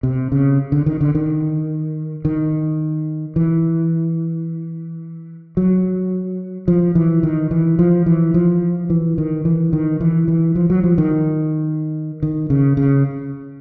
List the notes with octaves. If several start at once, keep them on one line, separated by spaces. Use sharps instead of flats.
C3
C#3
D3
D#3
D3
D#3
D#3
E3
F#3
F3
E3
D#3
E3
F3
E3
F3
E3
D#3
E3
D#3
E3
E3
F3
F#3
F3
D#3
D#3
C#3
C#3